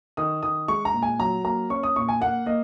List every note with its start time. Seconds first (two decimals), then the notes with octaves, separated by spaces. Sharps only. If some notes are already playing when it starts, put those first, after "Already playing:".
0.17 D#3 D#6
0.43 D#3 D#6
0.68 G#3 C#6
0.85 A#5
0.94 A#2
1.03 G#5
1.19 F#3 A#5
1.44 A#3 A#5
1.70 C#4 C#6
1.83 D#6
1.96 A#2 C#6
2.09 G#5
2.21 A#3 F#5
2.46 A#3 D#5